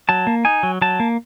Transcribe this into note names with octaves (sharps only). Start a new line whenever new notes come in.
F#3 A5
A#3
D#4 G#5
F#3
F#3 A5
A#3